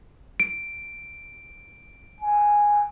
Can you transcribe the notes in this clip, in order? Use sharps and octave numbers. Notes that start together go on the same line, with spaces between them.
D7
G#5